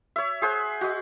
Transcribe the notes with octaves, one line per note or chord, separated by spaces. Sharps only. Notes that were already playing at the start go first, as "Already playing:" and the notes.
C#5 E5
G#4 C5 F#5
F#4 D#5